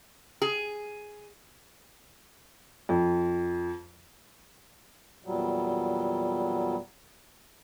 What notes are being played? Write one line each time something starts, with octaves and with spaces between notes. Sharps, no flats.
G#4
F2
E2 A#2 F#3 G3